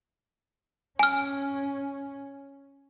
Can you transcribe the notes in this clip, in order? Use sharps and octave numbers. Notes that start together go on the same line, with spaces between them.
C#4 G#5 F6